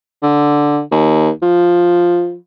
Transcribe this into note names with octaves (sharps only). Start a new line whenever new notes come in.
D3
D#2
F3